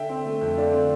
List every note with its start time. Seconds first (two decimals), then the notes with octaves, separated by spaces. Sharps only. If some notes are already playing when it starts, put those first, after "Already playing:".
Already playing: D3 E5 G5
0.09 C4
0.25 A3
0.41 F2
0.57 D3 D5 F5
0.73 C4